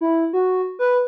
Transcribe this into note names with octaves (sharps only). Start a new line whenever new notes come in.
E4
F#4
B4